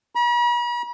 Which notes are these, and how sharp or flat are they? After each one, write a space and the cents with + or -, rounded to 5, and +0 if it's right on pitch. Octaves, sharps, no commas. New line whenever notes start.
B5 -45